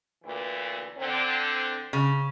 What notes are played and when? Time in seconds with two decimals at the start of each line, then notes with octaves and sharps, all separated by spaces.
0.24 D2 A#2 E3
0.98 D3 C4
1.93 C#3